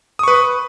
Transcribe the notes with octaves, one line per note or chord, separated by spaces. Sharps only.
B4 C#6 D#6